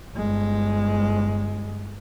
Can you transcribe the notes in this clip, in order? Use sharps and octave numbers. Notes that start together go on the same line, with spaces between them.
G1 G#3